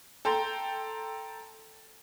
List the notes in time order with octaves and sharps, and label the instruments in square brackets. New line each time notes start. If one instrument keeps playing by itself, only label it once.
[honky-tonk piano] A4 G5 A#5 C6